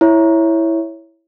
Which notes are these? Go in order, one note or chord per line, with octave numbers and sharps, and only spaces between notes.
E4 C#5